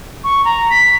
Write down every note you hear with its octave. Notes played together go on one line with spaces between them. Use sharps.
C#6
A#5
B6